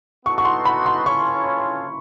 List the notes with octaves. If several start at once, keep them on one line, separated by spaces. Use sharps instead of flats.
B3 D#4 F#4 A4 C#6
C#6
C6
B5
C6
C#4 F4 A4 C#5 C#6